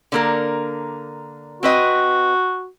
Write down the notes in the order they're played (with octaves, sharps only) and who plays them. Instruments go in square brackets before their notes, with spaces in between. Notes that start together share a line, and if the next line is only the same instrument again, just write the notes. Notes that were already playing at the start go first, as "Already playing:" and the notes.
[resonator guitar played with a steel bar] D3 A#3 A#4
[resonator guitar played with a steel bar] C4 B4 D#5 [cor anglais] F#4